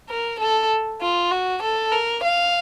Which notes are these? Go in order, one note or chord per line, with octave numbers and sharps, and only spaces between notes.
A#4
A4
F4
F#4
A4
A#4
F5